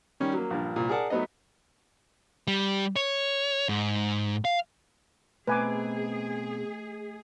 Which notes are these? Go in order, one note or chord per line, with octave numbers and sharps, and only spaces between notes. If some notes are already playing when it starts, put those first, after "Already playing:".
D#3 G3 C#4
F#3 A#3
A#1 G2 A#2
C2 A#2
G#4 A#4 D5 F#5 A5
F#3 A3 B3 D#4 D#5
G3
C#5
G#2
F5
B2 A3 C4 G#4 B4 G#5 D6